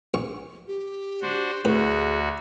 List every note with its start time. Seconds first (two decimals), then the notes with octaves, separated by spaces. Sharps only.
0.14 A#1 C#6
0.68 G4
1.22 D4 F#4 C5
1.65 D2 A2 F#4 G#4 B4